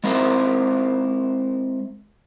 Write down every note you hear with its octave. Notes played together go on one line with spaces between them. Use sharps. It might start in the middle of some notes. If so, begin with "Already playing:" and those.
G#3 C4 E4 A#4 C5